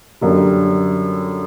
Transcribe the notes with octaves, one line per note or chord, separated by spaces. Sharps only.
F#2 D3 G3